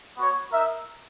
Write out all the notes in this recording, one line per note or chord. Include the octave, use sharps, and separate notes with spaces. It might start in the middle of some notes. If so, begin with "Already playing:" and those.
B3 F#4 C#5
D#4 A#4 E5